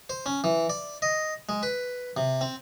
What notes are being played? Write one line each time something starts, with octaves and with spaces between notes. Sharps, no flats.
C5
C#4
E3
D5
D#5
G#3
B4
C3
C4